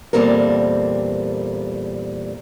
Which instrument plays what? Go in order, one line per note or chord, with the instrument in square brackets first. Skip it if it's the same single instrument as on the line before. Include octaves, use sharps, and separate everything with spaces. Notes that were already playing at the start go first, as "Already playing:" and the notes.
[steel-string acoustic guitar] E2 A#2 G3 C4 A4 A#4